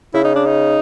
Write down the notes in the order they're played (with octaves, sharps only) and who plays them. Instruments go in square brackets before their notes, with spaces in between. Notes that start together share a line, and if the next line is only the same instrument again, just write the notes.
[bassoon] C#3 [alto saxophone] E4
[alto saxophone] D#4
D4
D#4